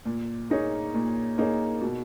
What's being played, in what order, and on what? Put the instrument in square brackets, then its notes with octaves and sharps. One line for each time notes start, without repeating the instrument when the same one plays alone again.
[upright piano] A#2
A#3 D#4 G#4 C#5
A#2
A#3 D#4 G#4 C#5
B2